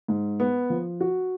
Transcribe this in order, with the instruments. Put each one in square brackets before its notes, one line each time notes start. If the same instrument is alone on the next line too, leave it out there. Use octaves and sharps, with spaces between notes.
[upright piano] G#2
B3
F3
F#4